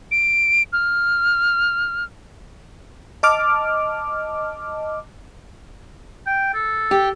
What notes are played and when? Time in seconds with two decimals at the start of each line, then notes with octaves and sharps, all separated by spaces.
0.11 D7
0.73 F6
3.23 D#5 A5 D6 F6
6.27 G5
6.54 A4
6.91 G4